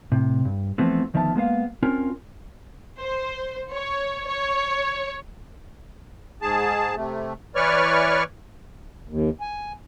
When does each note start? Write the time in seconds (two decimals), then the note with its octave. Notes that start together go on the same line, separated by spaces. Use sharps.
0.12 A2 C3
0.45 G2
0.78 E3 F3 A3 B3 C4
1.14 D2 D#3 F3 B3 E5 A5
1.35 G#3 A#3 B3 F5
1.83 C4 C#4 F4 A#4
2.98 C5
3.73 C#5
4.26 C#5
6.42 G#2 G#4 A5
6.96 C3 A3
7.55 E3 B4 C#5 D5 C#6 F6
9.09 D#2
9.41 G#5